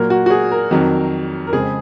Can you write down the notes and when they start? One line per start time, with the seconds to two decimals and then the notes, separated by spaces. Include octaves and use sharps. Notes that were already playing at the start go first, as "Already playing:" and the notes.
Already playing: A#2 F#3 A#3 A#4
0.10 F#4
0.26 F#4
0.30 G#4
0.51 A#4
0.71 F2 D#3 F#3
1.47 A#4
1.53 F2 C#3 G#3 C4 G#4